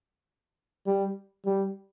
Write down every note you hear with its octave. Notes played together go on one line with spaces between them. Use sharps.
G3
G3